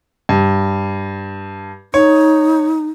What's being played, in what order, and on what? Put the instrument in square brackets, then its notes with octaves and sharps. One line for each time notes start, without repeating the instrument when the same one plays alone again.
[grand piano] G2
[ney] D#4 [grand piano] C#5